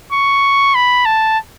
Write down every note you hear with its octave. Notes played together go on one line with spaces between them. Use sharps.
C#6
B5
A5